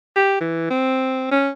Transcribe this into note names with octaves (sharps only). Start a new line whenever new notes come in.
G4
E3
C4
C#4